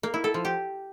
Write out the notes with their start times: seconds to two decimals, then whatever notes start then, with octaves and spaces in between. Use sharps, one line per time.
0.03 A#3
0.14 E4
0.24 A4
0.34 F3
0.45 G4